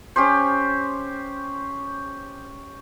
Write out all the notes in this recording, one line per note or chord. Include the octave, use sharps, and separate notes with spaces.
C#4 G4 C5